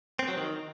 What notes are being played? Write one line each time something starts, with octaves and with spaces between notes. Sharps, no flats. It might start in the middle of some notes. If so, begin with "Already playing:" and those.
C4
F#3
D#3